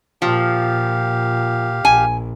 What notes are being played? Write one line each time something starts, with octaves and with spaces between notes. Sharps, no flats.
A#2 F3 G4 F5
A#1 G#5